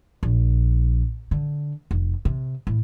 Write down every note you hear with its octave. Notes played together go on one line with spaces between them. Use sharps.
A#1
D3
F1
C3
A2